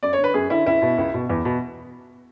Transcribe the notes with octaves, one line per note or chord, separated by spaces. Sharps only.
F#2 D5
C#5
D3
B4
F#2 G#4
D3 E4
C#2 E4
B2
C#2
B2
E2
B2